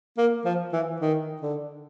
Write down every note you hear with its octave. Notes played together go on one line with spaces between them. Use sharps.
A#3
F3
E3
D#3
D3